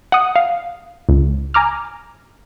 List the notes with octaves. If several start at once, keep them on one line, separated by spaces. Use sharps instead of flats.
F#5 D#6
F5
C#2
G#5 A#5 D6 F6